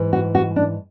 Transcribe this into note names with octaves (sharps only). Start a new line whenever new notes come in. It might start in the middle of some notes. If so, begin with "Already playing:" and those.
Already playing: G#2 E3
F#4
F#4
D4